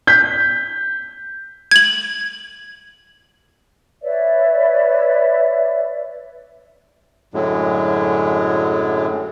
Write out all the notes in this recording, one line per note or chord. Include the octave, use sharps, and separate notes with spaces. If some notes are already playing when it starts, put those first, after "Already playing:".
G6 B6
G#6 F#7
B4 C#5 D5 E5
F#2 A2 D3 F#3 G#3